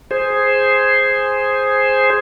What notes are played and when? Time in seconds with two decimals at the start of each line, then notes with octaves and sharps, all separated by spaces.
0.11 G#4 C5